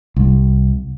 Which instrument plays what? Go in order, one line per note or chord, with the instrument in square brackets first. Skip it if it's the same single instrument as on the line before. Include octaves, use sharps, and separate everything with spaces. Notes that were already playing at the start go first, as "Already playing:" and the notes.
[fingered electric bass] C2